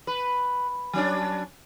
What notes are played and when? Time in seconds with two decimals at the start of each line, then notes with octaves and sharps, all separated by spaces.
0.07 B4
0.93 F#3 C#4 D4